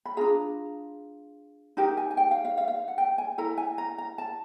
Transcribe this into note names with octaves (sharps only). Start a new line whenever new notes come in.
B5
D4 F4 G#4 A#5
D#4 G4 A#4 A#5
G#5
G#5
G5
F5
F5
F5
F5
F#5
G5
G#5
E4 A4 A#5
G#5
A#5
A#5
A5